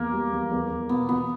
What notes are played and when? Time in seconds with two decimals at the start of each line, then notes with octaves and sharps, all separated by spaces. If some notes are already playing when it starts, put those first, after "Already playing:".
Already playing: E2 A#3
0.12 G3
0.32 E2
0.51 E2
0.70 E2
0.89 B2 B3
1.09 B2 B3